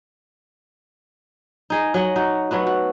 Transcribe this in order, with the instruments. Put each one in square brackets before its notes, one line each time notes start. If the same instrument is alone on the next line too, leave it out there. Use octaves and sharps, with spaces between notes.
[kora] D#4 G#4 D#5
F#3 D#5 F#5
D#4 F#4
F#3 A3 B3 F#4
F#4